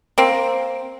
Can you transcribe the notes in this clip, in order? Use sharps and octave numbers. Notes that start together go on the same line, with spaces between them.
A#3 C4